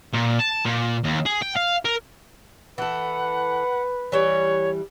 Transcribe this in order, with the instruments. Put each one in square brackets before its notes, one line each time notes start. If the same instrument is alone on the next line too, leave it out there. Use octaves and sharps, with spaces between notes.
[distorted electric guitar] A#2
A5
A#2
D#2
G#4
G5
F5
A#4
[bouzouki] E3 A4 [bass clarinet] B4 [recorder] F#5
[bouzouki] E3 G3 [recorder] C#5